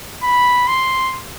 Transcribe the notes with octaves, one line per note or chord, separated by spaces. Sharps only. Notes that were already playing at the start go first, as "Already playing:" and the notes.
B5
C6